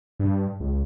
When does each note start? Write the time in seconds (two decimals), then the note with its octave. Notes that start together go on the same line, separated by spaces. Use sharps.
0.19 G2
0.60 C#2